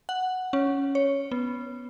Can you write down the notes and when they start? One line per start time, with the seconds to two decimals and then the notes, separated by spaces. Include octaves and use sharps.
0.09 F#5
0.53 C#4
0.95 C#5
1.32 B3